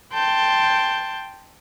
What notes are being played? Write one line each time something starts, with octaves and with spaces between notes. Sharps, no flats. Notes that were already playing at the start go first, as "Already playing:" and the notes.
G5 A5 C6 G6